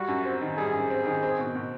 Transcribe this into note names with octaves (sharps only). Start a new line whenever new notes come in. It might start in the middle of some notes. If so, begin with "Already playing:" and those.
Already playing: G3 F#4
F#2
C4
D#3
G3 G#4
F#2
C4
D#3
C4
B2
B2